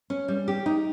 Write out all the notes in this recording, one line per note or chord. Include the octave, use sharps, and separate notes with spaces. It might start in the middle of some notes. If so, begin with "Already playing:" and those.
C#4
G3
G4
D#4